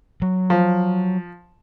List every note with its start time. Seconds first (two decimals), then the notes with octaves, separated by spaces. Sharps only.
0.22 F#3
0.50 F3